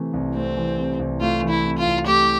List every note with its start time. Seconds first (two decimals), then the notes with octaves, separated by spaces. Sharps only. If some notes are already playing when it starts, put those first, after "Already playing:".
Already playing: C3 E3 A3
0.13 C2
0.35 A3 C4
0.57 E3
0.78 C3
0.99 C2
1.20 A3 F4
1.42 E3
1.49 E4
1.64 C3
1.78 F4
1.85 C2
2.06 A3 G4